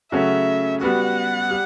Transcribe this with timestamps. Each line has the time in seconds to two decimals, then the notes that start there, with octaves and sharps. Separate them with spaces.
0.12 C#3 F#3 A3 C#4 F#4 E5
0.81 G3 B3 F#4 F#5
1.51 G3